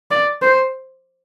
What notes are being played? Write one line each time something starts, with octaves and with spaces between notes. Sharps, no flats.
D5
C5